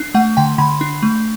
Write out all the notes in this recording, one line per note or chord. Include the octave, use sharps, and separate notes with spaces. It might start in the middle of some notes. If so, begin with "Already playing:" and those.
Already playing: D4
A3 F#5
D3 G5
D3 B5
D4
A3